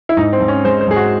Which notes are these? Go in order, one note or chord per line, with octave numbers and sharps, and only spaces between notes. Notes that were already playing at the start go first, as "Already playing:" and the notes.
E4
G#2 D#4
C4
G#2
C#4
G#3 C5
C5
G#2 G#4
F#4